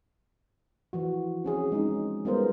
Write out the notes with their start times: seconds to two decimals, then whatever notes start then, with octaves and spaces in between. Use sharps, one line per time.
0.93 E3 F3 F#4
1.44 C4 C#4 G#4
1.72 G#3 C#4 D#4
2.25 G3 G#3 B3 F4 A#4 C5